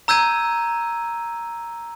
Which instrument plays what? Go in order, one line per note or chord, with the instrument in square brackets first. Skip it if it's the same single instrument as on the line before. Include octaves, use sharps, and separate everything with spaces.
[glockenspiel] A#5 E6 G6 G#6 D#7